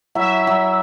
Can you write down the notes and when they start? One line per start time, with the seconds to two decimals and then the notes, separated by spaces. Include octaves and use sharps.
0.15 F#3 E4 E5 A#5
0.47 F#3